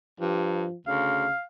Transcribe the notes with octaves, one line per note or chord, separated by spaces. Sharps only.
G2 F3
D2 C#3 F5